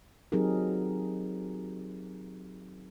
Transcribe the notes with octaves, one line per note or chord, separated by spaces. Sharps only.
F#3 C4 D#4 G4 G#4 A#4